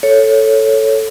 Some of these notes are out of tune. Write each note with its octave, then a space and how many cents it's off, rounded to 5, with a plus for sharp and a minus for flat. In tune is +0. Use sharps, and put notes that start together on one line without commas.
A4 +0 C#5 +0